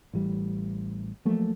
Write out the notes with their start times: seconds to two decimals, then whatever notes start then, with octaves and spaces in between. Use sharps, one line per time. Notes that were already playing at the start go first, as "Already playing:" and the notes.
0.13 A1 E3 G3
1.25 F3 F#3 A3 A#3